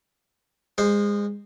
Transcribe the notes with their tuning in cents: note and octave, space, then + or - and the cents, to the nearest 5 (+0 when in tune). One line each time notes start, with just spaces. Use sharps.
G#3 -25 C5 +0